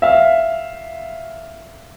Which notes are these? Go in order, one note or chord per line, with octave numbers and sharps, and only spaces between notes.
E5 F5